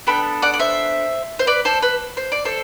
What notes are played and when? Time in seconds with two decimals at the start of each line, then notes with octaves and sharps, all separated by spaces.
0.07 B3 D4 A4 G5 B5
0.42 D5 F#5
0.54 D5
0.60 C5 E5
1.39 C5
1.47 B4 D5
1.65 A4 C5
1.82 B4
2.17 C5
2.32 D5
2.45 A4 C5